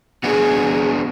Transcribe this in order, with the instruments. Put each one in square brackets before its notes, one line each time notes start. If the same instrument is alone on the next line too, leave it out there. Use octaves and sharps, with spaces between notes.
[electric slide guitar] B3 D4 F#4 [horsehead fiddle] G#4